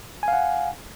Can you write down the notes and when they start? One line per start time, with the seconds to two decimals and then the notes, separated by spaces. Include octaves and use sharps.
0.23 G#5
0.28 F5
0.33 F#5